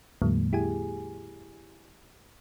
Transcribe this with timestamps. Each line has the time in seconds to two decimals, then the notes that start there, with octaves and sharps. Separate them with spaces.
0.22 E2 A2 D3 F#3 G#3 A#3
0.53 E4 G4 G#4 G#5